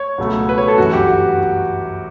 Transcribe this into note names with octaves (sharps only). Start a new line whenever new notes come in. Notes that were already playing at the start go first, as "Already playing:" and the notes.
Already playing: C#5
C#2 B2 F#3 A3
B4
C#5
A4
G1 F#2 E3 F#4
G4
F#4